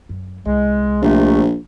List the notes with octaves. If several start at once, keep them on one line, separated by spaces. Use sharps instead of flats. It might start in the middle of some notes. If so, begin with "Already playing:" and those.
F#2
C2 G#3
A#1 C3 G#3 A3